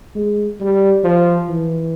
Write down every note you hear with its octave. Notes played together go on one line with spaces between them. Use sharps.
G#3
G3
F3
E3